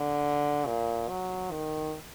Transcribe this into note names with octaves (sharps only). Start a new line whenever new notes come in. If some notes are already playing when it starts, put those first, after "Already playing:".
Already playing: D3
A#2
F#3
D#3